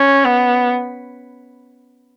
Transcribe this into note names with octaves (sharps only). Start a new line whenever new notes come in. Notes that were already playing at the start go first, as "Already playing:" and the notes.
Already playing: C#4
B3